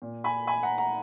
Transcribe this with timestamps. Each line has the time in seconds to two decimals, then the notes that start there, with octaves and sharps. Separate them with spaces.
0.02 A#2
0.24 G#5 B5
0.47 G#5 B5
0.63 F#5 A#5
0.78 F#5 A#5